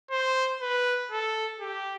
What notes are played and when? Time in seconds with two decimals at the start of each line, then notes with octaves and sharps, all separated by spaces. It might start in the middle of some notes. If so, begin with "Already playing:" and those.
0.11 C5
0.61 B4
1.11 A4
1.60 G4